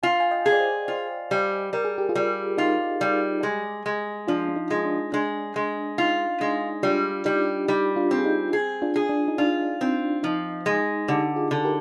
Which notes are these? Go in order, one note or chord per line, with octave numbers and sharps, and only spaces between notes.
F4 G#5
F5 G#5
D#5 G5
G#4
D5
C5 D#5
F4
G3
G3 A#4
G#4
G4
F4 G#4
G3
D#4 F4 G4
G3
G#3
G#3
F3 D4 F4
D4
D#4
G#3
D4
G#3 D4
G#3
D#4 F4
G#3 D4
G3 D4 F4
G3 D#4 G4
G3 D#4 G4
D4 F4
C4
G#4
D#4 G4
G#4
D4 F4
G#4
D4
D#4
D4 F4
C4
F3 D#4
G#3
D3 D#4 G4
F4 G#4
D3
G4 A#4